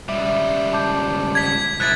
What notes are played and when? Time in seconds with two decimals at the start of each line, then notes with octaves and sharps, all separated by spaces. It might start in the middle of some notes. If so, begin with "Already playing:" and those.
0.09 C#2 G3 E5
0.73 A5 D6 G6
1.35 G#6 B6
1.80 C2 E4 F#6 A6